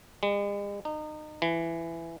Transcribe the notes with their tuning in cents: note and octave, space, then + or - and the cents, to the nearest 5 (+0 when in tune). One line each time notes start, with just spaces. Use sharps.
G#3 -45
D#4 -30
E3 +15